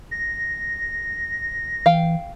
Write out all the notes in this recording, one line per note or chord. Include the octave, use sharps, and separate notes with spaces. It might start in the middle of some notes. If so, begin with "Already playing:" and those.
A#6
E3 F5 G5